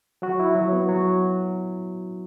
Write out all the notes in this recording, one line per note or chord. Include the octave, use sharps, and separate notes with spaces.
F#3 F#4
E4
F#3
B3
F#3